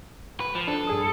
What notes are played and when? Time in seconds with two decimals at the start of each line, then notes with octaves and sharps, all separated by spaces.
0.40 B4
0.55 F3
0.68 D4 A4
0.87 G2 G#4 D#6